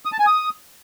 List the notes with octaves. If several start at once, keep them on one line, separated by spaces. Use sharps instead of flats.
D#6
A5
G#5
D#6